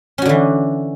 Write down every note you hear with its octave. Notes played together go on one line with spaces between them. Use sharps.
D3 E3 C#4 F#4